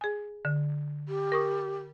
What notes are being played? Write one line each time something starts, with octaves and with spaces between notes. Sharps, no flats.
G#4 G#5
D3
G4
A#4 C#6 D#6